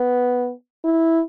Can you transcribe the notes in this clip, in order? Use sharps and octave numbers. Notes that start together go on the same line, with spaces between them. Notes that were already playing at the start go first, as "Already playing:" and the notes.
Already playing: B3
E4